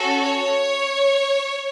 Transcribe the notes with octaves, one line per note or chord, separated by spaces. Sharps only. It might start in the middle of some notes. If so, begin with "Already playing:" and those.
Already playing: C#4 F#4 A4
C#5